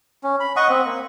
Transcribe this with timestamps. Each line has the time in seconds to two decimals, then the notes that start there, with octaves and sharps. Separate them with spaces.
0.23 C#4
0.40 B5
0.56 D#5 F#5 C#6 D#6
0.69 C4
0.85 A#3